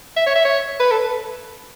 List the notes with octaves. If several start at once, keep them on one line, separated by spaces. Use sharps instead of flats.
E5
C#5
E5
C#5
B4
A4